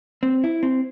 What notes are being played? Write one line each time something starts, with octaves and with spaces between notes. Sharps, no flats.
C4
E4
C4